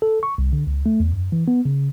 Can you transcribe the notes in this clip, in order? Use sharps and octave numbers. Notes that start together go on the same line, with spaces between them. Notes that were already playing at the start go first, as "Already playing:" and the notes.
A4
C#6
C2
D3
C#2
A3
E2
F#2
E3
B3
C#3